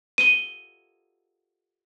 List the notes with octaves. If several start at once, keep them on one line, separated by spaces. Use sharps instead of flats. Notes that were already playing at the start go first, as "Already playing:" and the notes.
D#7 G7